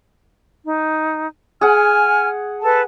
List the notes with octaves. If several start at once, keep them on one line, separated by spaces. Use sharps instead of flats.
D#4
G#4 F#5 G#5 F6
A4 B4 A5